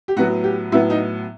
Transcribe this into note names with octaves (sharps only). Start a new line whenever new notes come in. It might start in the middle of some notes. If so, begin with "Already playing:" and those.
G4
A2 F#3 B3 F#4
G4
A2 F#3 B3 E4
D#4